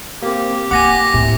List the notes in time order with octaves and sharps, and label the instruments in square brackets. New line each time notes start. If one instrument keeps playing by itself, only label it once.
[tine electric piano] A#3 C4 [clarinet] G4
[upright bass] A#3 [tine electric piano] F#5 G#5 [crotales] D6 A#6
[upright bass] A2 [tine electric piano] C3